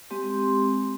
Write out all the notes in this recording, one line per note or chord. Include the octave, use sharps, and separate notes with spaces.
G#3 C4 G4 C6